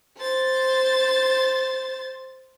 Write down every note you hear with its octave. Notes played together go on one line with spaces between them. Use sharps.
C5 A6